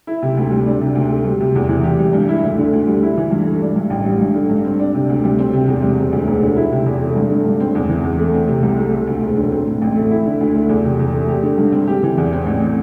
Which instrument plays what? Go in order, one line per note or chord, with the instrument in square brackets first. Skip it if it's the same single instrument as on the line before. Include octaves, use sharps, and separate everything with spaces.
[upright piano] E4
C3
D2
G3
D4
C3
D2
A3
G3
C3
E2
E3
G4
G3
G2
E4
D2
D3
D2
G3
E4
E3
G2
A3
D4
G2
A1
G3
G2
D3
G2
C4
D4
C3
D2
G3
C4
C3
E2
G3
E1
D2
E1
D3
E4
C3
E2
A3
G2
D3
G2
C4
E2
E3
E2
A3
C4
C3
C2
A3
A3
D2
E1
D3
C4
A2
A1
A3
E4
D3
D2
A3
E2
C3
E2
A3
G4
D3
G2
C4
G4
E3
E2
C4
A1
A2